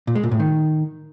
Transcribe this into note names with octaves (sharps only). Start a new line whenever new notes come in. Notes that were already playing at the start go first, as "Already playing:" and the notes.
A#2
G#3
A#2
A2
D#3